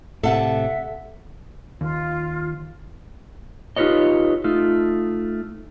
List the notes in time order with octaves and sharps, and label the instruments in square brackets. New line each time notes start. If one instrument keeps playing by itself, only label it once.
[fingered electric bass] A2 C3 [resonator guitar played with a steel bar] A4 F#5 [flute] E5
[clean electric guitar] D#2 [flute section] F4
[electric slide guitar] D#4 F4 G4 B4 C#5 D#5
A3 D#4 F4